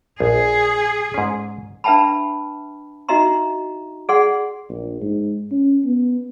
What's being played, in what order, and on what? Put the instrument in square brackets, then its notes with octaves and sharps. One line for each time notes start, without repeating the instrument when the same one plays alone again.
[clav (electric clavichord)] A#1 [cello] G#4
[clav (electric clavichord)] G#2 C#4
[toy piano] D4 B4 E5 G5 A5 B5
D#4 F#4 D#5 E5 A#5 C6
G#4 D5 F#5 C6
[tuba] A#1
G#2
C#4
B3